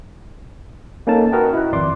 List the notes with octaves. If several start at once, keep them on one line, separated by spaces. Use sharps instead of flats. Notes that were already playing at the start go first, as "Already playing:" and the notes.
A#3 C#4 D#4 A4 A5
F#4 A#4 B4 D#5 G5
E4 F#6
G#1 F2 D5 C6 D6